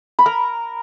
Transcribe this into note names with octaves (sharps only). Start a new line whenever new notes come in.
B5
A#4 A#5